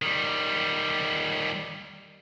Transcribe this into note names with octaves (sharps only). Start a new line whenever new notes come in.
D#3 G3